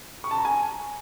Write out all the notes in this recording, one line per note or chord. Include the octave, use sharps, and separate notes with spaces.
C#6
A5
A#5
G#5